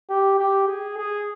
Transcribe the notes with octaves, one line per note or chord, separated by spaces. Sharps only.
G4
G4
G#4
G#4